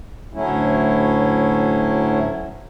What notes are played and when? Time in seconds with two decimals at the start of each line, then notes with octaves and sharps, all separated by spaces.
0.34 D2 A2 F#3 A3 C#4 E4